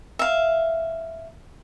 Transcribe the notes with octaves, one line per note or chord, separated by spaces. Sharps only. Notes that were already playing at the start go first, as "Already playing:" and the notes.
E5 F5